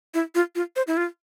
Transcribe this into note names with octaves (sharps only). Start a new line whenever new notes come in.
E4
F4
F4
C5
E4
F4